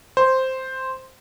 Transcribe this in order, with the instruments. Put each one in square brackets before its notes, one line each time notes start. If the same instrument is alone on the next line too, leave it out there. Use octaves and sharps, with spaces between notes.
[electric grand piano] C5